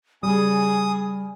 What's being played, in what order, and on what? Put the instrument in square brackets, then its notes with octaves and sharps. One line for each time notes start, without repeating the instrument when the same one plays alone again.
[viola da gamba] C#3 G#4 [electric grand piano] G3 [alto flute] G#5 [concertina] D#6